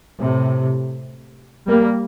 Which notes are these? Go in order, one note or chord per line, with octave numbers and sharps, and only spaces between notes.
A2 C3
G3 A#3